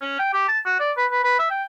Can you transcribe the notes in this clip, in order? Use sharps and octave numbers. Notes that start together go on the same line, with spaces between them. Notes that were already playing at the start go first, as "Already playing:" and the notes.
C#4
G5
G4
A5
F#4
D5
B4
B4
B4
E5
G5